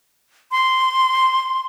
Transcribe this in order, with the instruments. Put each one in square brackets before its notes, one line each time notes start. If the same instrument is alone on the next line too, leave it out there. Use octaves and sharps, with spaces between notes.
[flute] C6